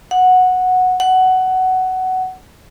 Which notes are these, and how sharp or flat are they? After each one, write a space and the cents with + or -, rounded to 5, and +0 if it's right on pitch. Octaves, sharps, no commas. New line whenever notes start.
F#5 -10
F#5 +15